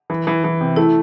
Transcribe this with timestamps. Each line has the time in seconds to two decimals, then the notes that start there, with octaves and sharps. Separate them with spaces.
0.10 E3
0.27 E3
0.44 E3
0.61 C3
0.76 A3 E4